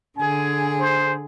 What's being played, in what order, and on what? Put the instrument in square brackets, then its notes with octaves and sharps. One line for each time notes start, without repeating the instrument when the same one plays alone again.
[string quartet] D3 G#4 [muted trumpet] G#5
[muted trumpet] C5